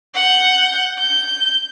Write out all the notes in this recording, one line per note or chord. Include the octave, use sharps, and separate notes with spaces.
F#5 G6
G6